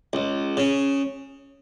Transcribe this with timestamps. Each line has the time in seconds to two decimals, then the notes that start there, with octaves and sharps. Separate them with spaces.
0.13 C#2
0.57 C#3